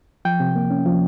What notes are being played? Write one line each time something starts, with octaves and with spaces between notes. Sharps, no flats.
F3 G5
C3
A#3
C#4
F3